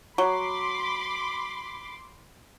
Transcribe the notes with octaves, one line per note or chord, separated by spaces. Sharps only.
F#3 B5 C6 D6